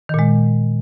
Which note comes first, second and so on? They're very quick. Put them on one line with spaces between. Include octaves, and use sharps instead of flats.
D#3 A#2 G#3